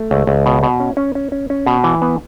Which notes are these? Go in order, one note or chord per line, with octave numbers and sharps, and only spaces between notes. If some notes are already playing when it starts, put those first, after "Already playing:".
Already playing: A3
C#2
C#2
B2
B2
C#4
C#4
C#4
C#4
C#4
B2
E3
B3